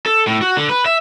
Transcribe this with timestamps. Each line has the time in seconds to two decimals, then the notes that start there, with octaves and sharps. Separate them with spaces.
0.06 A4
0.27 A2
0.41 F#4
0.57 D3
0.69 B4
0.86 E5